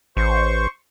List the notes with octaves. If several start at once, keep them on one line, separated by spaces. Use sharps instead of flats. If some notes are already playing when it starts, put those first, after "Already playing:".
A1 C5 C#6